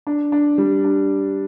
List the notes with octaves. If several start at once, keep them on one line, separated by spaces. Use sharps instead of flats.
D4
D4
G3
D4